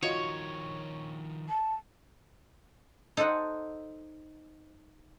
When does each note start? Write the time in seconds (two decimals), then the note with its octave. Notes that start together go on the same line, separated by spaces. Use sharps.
0.03 D#3 F3 F4 F#4 C#5 D#5
1.49 A5
3.17 D#4 A4 C5 D#5 F#5